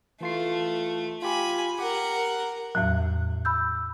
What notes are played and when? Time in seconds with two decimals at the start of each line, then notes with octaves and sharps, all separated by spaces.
0.21 E3 A3 F4 C7
1.22 F4 G4 G#5 B5
1.79 G4 A#4 F#5
2.75 E2 A2 F#3
3.45 B5 E6 G6